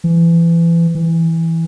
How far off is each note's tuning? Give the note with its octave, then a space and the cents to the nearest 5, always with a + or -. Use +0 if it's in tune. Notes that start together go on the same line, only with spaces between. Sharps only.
E3 +30
E3 -5